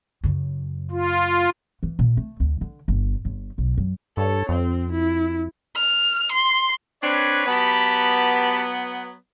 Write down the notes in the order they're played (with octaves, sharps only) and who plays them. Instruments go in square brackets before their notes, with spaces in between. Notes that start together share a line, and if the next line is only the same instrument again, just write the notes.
[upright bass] F#2 C#3
[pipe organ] F4
[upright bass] E3
A#2
A3
D2
D3
G1
G1
B1
F#2
[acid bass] G2 [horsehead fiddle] A4 C#5
[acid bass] F2 [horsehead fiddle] C4
[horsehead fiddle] E4
[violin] F6
C6
[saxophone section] C4 D4 [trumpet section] B4 C#5
[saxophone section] F#3 B3 [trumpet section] G4 A5 B5